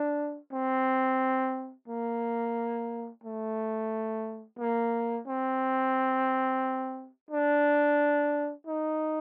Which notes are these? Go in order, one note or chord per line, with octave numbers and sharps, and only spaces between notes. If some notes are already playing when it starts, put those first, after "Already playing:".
Already playing: D4
C4
A#3
A3
A#3
C4
D4
D#4